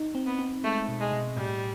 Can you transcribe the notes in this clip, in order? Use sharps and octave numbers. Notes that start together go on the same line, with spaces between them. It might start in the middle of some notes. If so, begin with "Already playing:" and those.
Already playing: D#4
C4
B3
C4
G#3 A3
B2
G#3
B2
A2 G3